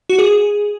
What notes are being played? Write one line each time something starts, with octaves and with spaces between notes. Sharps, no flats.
F#4
G#4